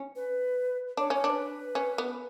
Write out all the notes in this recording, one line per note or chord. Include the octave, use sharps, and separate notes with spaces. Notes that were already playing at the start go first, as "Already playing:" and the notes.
Already playing: C#4
B4
D4 C#5
C#4 C#5
D4
B4
C#4
B3